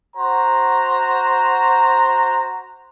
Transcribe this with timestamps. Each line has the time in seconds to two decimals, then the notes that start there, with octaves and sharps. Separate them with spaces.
0.16 F#4 C5 A#5